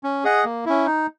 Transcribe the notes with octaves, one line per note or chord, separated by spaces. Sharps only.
C#4
G#4 D#5 F#5
A#3
C#4 E4
D#4